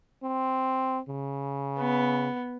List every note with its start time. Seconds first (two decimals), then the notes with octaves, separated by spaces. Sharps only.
0.23 C4
1.09 C#3
1.79 B3